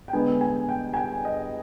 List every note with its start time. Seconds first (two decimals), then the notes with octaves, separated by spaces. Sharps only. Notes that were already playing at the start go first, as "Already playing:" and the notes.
0.08 G5
0.13 D3 G#3 B3 G#5
0.41 G#5
0.69 G5
0.94 G#5
0.97 G5
1.25 D#5